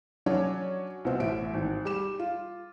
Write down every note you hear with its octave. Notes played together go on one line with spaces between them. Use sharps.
F#3 C#4 D4 F#4 C#5
C2 B2 C4
A1 A2 E5 D7
G#1
G3 D6 E7
F4